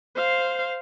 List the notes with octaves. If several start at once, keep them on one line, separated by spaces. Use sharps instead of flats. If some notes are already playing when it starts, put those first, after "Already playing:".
C5 F5